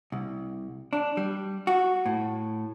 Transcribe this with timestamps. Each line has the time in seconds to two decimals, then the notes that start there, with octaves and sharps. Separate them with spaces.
0.12 C2
0.93 D4
1.17 G3
1.67 F#4
2.06 A2